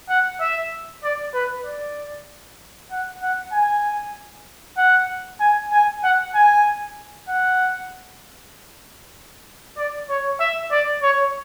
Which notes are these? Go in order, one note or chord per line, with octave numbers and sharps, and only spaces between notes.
F#5
E5
D5
B4
D5
F#5
F#5
G#5
F#5
G#5
G#5
F#5
G#5
F#5
D5
C#5
E5
D5
C#5